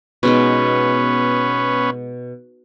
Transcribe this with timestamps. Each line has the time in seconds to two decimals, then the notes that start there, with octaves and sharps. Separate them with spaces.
0.23 B2 G#3 B3 C#4 D#4